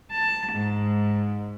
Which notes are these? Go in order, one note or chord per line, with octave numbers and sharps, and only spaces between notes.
A5
G#2